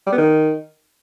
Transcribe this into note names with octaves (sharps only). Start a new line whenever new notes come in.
G3
B3
D#3